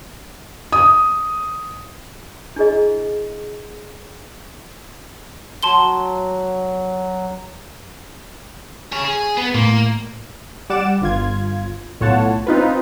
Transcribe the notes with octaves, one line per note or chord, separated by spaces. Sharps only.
D#6
D4 E4 G#4 D#5
F#3 A5 C6 G7
G#4 C#5
G#4
B3
A2 A#3
G3 D5 F#5 D6 E7
G1 F4 G#6
B1 A2 F4 C#5 F#5 A5
C4 D#4 F4 B4